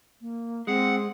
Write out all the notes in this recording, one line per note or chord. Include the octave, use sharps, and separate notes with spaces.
A#3
G#3 C4 F#5